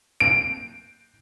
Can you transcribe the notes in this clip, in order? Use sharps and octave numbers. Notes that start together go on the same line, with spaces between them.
D7